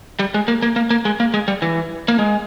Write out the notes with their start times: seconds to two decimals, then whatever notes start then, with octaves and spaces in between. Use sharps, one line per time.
0.19 G3
0.34 G#3
0.48 A#3
0.62 A#3
0.76 A#3
0.90 A#3
1.05 G#3
1.20 A#3
1.34 G#3
1.48 G3
1.62 E3
2.08 A#3
2.19 G#3